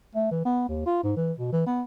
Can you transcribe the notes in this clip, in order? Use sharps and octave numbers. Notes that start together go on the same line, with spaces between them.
A3
E3
B3
D#2
F4
G#2
E3
B2
E3
B3